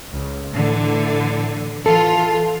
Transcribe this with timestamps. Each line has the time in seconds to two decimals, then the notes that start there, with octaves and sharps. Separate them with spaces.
0.11 C#2
0.54 A2 D3 E3
1.86 E3 F4 A4